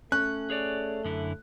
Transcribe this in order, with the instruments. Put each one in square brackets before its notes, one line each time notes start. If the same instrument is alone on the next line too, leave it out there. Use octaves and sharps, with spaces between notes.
[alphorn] A3 [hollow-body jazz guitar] C#4 [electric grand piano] F#6
[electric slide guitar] G#4 C#5 D5
F#2 D3 E4